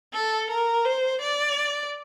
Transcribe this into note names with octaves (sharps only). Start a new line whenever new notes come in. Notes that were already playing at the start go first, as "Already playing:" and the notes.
A4
A#4
C5
D5